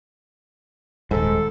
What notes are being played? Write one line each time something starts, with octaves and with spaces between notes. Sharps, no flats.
D#1 G#2 A4